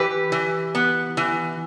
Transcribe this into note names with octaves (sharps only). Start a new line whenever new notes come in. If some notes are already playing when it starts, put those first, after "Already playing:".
Already playing: E3 G4 B4
E3
B3
E3